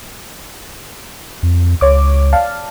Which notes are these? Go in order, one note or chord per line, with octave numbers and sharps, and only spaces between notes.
F2
C#2 C#5 D6
D5 F5 A5